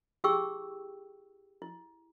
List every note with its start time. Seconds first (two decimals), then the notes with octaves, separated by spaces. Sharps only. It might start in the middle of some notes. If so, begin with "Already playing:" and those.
0.24 E4 G4 G#4 G5 C#6 E6
1.62 E4